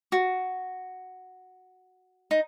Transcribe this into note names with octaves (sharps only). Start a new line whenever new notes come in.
F#4
D#4